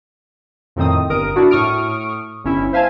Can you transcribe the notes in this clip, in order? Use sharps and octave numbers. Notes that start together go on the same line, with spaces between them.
F2 A2 D#3 C4 D#6
G1 A#4 D#6 D7
D4 E4 F#4
A2 C#6 D#6 F6 D7
G1 C#4 E4
C5 E5 F5 G#5 A5 G#6